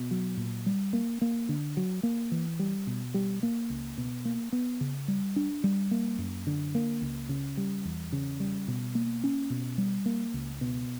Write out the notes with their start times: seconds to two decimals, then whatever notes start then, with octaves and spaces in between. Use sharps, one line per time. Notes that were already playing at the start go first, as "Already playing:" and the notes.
Already playing: B2
0.11 F#3
0.37 A#2
0.66 G3
0.93 A#3
1.22 A#3
1.49 D3
1.77 F#3
2.03 A#3
2.32 E3
2.59 G3
2.87 B2
3.14 G3
3.43 A#3
3.70 C#2
3.98 B2
4.25 A#3
4.52 B3
4.81 C#3
5.08 G3
5.36 D4
5.64 G3
5.91 A#3
6.18 F#2
6.47 D3
6.75 A#3
7.02 C#2
7.29 C#3
7.57 G3
7.85 E2
8.12 C#3
8.40 G3
8.68 B2
8.95 A#3
9.24 C#4
9.50 B2
9.78 G3
10.06 A#3
10.34 C#2
10.61 B2